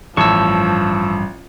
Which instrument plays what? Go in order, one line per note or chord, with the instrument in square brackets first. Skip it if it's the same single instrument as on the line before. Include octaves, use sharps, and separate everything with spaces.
[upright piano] A1 [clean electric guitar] G2 A5 [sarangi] F3 [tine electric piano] C#6 E6